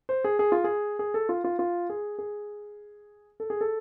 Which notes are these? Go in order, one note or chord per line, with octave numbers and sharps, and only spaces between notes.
C5
G#4
G#4
F4
G#4
G#4
A4
F4
F4
F4
G#4
G#4
A4
G#4
A4